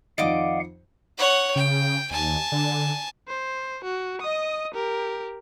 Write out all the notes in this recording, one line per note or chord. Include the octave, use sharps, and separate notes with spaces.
F2 D#3 D5 D#5 F5 F#5 D6
C#5 F#5
C#3 G5
D#2 G#5 A5
D3
C5
F#4
D#5 D#6
G4 A#4